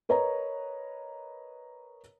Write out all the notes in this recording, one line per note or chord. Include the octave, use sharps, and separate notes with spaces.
A#4 B4 C#5 D#5 A#5